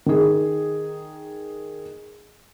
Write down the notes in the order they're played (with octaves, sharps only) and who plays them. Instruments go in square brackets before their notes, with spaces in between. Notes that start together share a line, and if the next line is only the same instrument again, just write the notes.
[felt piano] D#3 G#4